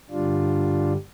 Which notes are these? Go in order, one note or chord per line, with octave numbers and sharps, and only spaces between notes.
G2 D3 G3 D4 F4